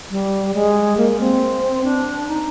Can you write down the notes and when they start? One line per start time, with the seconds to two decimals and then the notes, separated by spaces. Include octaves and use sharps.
0.10 G3
0.54 G#3
0.97 A#3
1.20 C4
1.84 D4
2.27 D#4